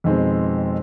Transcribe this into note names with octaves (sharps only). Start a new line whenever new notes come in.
F2 B2 D#3 G#3 C4